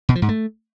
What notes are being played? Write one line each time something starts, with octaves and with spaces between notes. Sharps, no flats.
B2
F3
G#2
A3